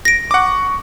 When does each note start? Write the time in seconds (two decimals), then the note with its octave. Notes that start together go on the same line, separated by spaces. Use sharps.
0.05 A#6 D7
0.31 F#5 C#6 D6